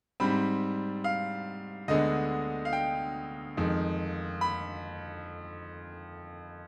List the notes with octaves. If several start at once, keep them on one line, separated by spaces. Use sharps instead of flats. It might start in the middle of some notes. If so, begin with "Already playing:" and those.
G#2 G3 C4 B5
F5
D2 D3 G#3 B3 D#5
F5
G5
F2 D#3 G#3
B5